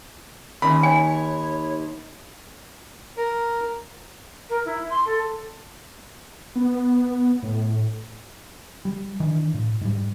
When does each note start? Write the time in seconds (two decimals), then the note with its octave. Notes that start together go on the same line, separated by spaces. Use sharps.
0.62 D#2 C#4 B5
0.83 C#5 G#5
3.17 A#4
4.49 A#4
4.65 E4
4.90 C6
5.05 A4
6.55 B3
7.43 A2
8.85 G3
9.20 D#3 E3 D4
9.54 A2
9.81 G#2 G3